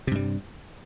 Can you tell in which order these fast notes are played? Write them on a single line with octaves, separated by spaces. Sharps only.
C3 G2 G3